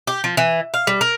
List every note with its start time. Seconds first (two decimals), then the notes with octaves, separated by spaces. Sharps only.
0.07 G4
0.24 F3
0.37 E3
0.74 F5
0.87 G3
1.01 A#4